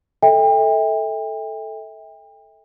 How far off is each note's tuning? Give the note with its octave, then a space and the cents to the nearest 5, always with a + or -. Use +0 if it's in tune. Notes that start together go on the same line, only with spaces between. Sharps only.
A4 +0 E5 -30 G5 +35